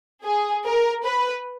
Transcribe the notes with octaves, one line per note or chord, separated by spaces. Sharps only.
G#4
A#4
B4